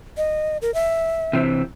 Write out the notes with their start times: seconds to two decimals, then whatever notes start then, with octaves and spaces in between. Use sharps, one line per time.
0.17 D#5
0.62 A#4
0.74 E5
1.33 C3 E3 C4